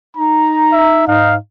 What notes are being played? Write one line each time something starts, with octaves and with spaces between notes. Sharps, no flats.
D#4 A#5
E5
G#2 D#4 F5